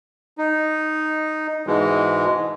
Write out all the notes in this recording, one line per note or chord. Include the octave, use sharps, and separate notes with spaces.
D#4
G#2 B2 E3 G#3